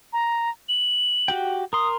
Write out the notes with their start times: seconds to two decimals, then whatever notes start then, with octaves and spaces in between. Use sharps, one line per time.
0.13 A#5
0.69 F#7
1.28 F#4 G4 G5
1.73 A#4 C6 D#6